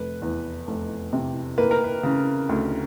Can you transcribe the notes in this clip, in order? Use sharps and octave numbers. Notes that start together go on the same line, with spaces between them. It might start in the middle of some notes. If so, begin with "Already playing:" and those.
Already playing: F1 B4
E2
F1
C3
A#3 B4
A#4
B4
C#3
D2